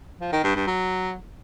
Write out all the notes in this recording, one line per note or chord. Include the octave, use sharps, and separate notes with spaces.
F3
D#3
G2
G2
F#3